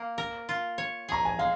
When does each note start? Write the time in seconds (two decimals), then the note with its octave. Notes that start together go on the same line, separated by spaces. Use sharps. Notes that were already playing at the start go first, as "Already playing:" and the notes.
Already playing: A#3
0.18 A#4
0.49 F4
0.78 C#5
1.08 G#4 A#5
1.25 G#5
1.39 G#3 F5